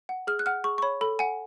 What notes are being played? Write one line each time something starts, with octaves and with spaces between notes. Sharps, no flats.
F#5
G#4 F6
F#6
F#5 F6
G#4 C#6
C#6
C#5 B5
A4 B5
F#5 G#5